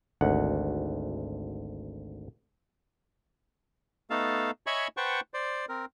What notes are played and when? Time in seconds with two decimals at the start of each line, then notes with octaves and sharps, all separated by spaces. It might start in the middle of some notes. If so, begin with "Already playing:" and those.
0.21 G#1 D2 F#5
4.10 A3 B3 D#4 A4 F5 A5
4.67 C#5 D#5 E5 G#5 B5 C#6
4.97 B4 C5 F#5 G5 A5 C#6
5.34 C5 D5
5.69 C4 A#4